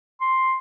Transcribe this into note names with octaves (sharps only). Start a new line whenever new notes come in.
C6